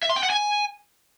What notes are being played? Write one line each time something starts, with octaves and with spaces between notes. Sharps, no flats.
E5
C6
G5
F#5
G#5